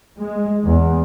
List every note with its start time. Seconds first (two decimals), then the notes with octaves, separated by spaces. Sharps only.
0.20 G#3
0.64 E2